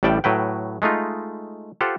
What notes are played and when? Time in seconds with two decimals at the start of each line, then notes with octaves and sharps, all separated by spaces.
0.03 A1 A2 G3 D5 G5 A5
0.24 A2 F#3 B4 G5
0.82 G#3 A3 D#4 F4
1.81 F4 G4 A4 C5 F#5